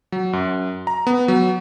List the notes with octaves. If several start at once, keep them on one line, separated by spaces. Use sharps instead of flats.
F#3
F#2
A#5
B3
F#3